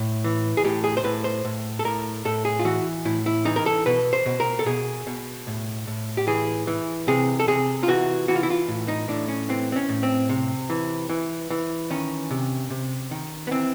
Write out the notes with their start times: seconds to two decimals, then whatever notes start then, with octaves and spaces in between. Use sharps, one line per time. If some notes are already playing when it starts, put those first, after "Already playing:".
Already playing: A2
0.24 E3
0.57 G#4
0.64 A2 G4
0.84 G#4
0.97 C5
1.04 A2 B4
1.24 C5
1.45 A2
1.79 A4
1.85 A2 A#4
2.25 A2 A4
2.45 G#4
2.59 F4
2.65 E3 F#4
3.05 A2 E4
3.26 E4
3.45 E3 D#4
3.56 A#4
3.66 A4
3.86 B2 B4
4.13 C5
4.26 B2
4.40 A#4
4.59 A4
4.66 B2 G#4
5.07 B2
5.47 A2
5.87 A2
6.17 G4
6.27 E3 G#4
6.67 E3
7.08 C3 G#4
7.39 A4
7.47 C3 G#4
7.83 F4
7.88 E3 F#4
8.28 E3 F#4
8.36 F4
8.43 E4
8.50 F4
8.68 A2
8.88 D#4
9.08 A2 D4
9.28 C#4
9.49 E3 C4
9.72 C4
9.76 C#4
9.89 A2
10.03 C4
10.29 C3
10.70 E3
11.10 E3
11.50 E3
11.90 D#3 C#4
12.31 C3
12.70 C3
13.11 D#3
13.47 B3
13.51 E3 C4